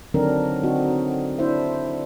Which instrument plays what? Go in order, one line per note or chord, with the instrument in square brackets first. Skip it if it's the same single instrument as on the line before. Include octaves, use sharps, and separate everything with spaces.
[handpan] D3 D#3 F#3 C4 D4 A#4
D3 C4 D#4 F#4
D4 E4 C5 E5